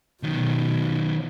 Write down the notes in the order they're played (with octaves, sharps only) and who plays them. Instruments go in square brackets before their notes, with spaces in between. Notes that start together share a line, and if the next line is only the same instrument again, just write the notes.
[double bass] B2 [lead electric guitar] D#3 F#3